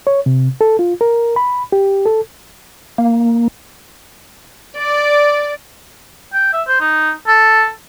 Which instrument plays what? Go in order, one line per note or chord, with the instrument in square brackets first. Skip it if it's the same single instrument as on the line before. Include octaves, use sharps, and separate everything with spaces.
[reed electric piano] C#5
C3
A4
F4
A#4
B5
G4
A4
[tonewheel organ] A#3
[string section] D5
[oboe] G5
E5
C5
D#4
A4